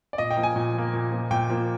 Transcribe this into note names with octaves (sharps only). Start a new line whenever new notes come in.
D5
A#2 D#5
G5
F3 A#3
G#5
A#2
F3 A#3
A#2
F3 A#3
A#2 G5
F3 A#3